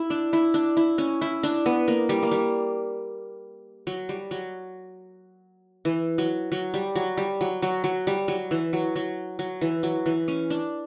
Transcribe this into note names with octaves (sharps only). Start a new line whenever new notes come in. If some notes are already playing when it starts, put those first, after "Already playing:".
Already playing: E4
D4
E4
D4
E4
C#4
E4
D4
B3
A#3
G3
A#3
G3
F#3
G3
F#3
E3
F#3
F#3
G3
F#3
G3
F#3
F#3
F#3
G3
F#3
E3
F#3
F#3
F#3
E3
F#3
E3
C#4
D4